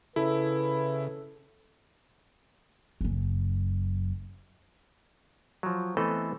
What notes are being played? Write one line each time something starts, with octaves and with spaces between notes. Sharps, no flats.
C#3 E4 A4 B4
F#1 F#2
F3 F#3
E3 A3 B3 C4 A4 D#5